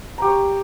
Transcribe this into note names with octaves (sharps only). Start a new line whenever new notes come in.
G4 C#5 A#5